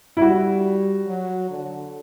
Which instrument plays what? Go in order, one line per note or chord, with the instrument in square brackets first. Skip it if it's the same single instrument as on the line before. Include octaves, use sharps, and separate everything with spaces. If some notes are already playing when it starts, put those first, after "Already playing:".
[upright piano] E4
[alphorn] G3 [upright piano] F#4
[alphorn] F#3
D3